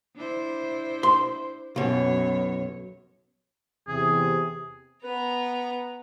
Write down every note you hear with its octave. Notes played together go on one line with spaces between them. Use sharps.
D4 E4 C5
C6
B1 F#2 B2 C#5
E2 C3 G#4
B3 B4 A#5